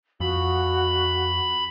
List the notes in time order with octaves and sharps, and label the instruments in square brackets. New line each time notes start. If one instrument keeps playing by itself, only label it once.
[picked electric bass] F2 [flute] F#4 [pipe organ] B5